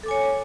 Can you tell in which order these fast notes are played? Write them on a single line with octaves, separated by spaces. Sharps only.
A4 D6 G#5 C#5